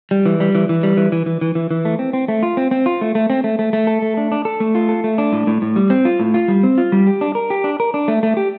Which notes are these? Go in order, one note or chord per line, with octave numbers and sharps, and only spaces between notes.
G3
E3
G3
E3
E3
G3
E3
E3
E3
E3
E3
E3
A3
C4
C4
A3
F4
C4
C4
F4
A3
A3
C4
A3
A3
A3
A4
A3
D4
D4
A4
A3
F4
A4
A3
D4
A2
A2
A2
G3
C4
F4
A2
F4
G3
C4
F4
G3
G4
D4
A#4
G4
D4
A#4
D4
A3
A3
G4